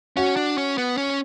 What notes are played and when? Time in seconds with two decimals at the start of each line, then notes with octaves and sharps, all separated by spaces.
0.17 C#4 F#4
0.36 D4
0.58 C#4
0.78 B3
0.98 C#4